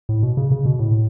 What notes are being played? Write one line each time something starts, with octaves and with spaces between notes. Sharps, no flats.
A2
B2
C#3
C#3
B2
A2